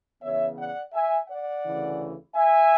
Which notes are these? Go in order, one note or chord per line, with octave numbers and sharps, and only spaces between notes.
C#3 E3 B3 C#5 E5
D5 F#5
E5 G#5
D5 F#5
D2 C#3 E3
E5 G#5